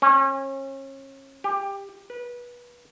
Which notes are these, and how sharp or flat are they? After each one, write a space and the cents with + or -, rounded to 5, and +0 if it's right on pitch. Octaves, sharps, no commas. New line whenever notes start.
C#4 -35
G4 +15
B4 -25